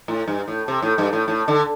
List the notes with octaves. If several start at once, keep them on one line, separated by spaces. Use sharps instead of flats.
A2
G2
A2
C3
A2
G2
A2
A2
D3